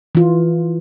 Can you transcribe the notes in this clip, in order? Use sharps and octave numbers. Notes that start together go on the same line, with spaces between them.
E3 F4